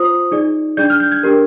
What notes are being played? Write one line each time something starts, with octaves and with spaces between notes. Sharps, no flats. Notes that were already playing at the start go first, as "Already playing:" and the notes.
Already playing: F4 C5 D#6
D#4 G#4 D5
D4 G#4 D5 G6
F6
G6
G#6
D4 G4 A#4